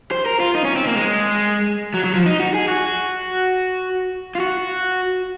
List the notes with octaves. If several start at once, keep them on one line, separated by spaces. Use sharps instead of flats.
C5
A#4
F4
D#4
C#4
C4
A#3
G#3
F#3
F#3
F3
D#4
F#4
G#4
F#4
F4
F#4